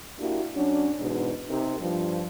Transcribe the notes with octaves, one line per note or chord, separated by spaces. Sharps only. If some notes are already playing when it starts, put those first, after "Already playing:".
A#3 D4 E4 F#4 G4
F#3 C#4 D4
E2 G#2 B2
C3 D#4 G4 A#4
G2 F3